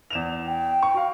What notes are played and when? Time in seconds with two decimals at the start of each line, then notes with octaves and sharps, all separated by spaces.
0.10 E2 E7 F7
0.47 G5
0.83 C#6
0.94 F#4 F5